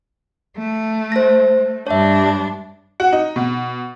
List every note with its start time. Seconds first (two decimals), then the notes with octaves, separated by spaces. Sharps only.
0.57 A3
1.12 C5 A#6
1.87 G2 D4 C#5 E5
3.00 F#4
3.13 D#4
3.36 B2